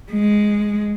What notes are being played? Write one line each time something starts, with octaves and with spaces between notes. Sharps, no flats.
G#3